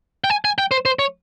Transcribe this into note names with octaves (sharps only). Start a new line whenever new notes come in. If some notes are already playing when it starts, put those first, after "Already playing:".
G5
G#5
G#5
G5
C5
C5
C#5